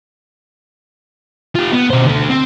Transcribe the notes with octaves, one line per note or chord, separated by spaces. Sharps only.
F4 G4
B3
B2 C5
D3 A3
C4